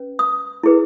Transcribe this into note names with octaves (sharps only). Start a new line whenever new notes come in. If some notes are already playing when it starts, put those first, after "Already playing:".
Already playing: C#4 B4
D#6
E4 G#4 B4